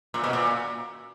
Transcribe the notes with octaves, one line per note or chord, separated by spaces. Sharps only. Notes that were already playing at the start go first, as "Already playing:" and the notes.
A#2
B2
A#2